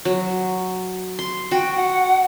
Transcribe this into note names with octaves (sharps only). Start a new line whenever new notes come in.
F#3
C6
F#4 G5
F#5